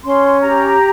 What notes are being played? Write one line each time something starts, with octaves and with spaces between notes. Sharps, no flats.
C#4 C6
G4 A#5